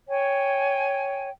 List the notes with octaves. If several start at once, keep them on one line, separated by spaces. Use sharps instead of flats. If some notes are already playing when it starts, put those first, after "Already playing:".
C#5 G5 G#5